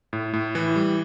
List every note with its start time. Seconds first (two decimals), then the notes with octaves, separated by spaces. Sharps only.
0.13 A2
0.33 A2
0.55 E3
0.76 G3